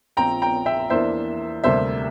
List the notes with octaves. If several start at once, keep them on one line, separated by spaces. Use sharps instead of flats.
A#1 A#2 F3 C4 G5 A#5
G5 A#5
E5 G5
E2 E3 A#3 D4 C5 E5
D2 C3 G3 A#3 C5 E5